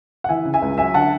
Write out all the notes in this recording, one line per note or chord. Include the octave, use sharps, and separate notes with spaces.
F#5
E3 E5 G#5
C#3
E5 G#5
C#2
F#3 E5 G#5
D3 F#5 A5